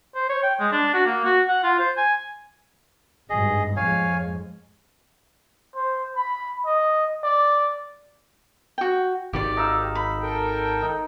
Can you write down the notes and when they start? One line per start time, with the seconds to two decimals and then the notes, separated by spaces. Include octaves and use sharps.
0.15 C5
0.29 C#5
0.43 G5
0.60 G#3
0.72 D4
0.94 F#4
1.06 A#3
1.25 F#4
1.48 F#5
1.63 F4
1.79 C5
1.97 G#5
3.30 G#1 G2 G#4 D#5
3.77 F2 G#2 G#3 C#5 F5 G#5
5.75 C5
6.16 B5
6.66 D#5
7.24 D5
8.78 F#4 G5
9.33 G#1 D#3 G4 D5
9.57 D#4 F5 E6
9.95 B5
10.21 A4 A#4 G5
10.82 D#4